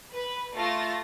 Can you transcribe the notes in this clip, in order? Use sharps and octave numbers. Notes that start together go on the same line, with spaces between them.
B4
A3 F4 A6 A#6